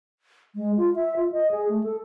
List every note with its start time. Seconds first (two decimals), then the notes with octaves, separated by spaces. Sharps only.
0.55 G#3
0.77 F4
0.95 E5
1.16 F4
1.32 D#5
1.51 G#4
1.69 A3
1.83 A4